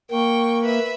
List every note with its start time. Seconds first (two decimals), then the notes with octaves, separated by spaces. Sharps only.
0.11 A#3 G5 C#6
0.63 B4 E5